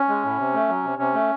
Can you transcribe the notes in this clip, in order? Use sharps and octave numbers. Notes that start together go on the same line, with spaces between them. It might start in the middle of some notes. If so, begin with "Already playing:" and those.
Already playing: C#4
G#3
A2
C3
A3
F#3
C3
C3 C#4
A3